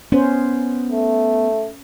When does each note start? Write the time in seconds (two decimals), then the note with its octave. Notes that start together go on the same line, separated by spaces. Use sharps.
0.12 B3 C#4 C5
0.92 A3